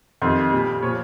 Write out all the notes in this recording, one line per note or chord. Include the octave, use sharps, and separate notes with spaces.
F2 D#3 G3 C6
A#2 G3
A#2 F3 C#5